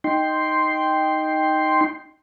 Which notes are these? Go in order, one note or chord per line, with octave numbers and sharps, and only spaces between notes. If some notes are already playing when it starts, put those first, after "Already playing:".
D#4 G5 C6